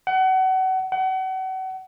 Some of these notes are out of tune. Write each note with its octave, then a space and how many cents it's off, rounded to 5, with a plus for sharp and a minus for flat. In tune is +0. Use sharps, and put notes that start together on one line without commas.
F#5 +30
F#5 +35